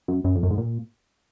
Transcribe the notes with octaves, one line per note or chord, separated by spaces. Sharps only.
F#2
F#2
F2
F#2
G#2
A#2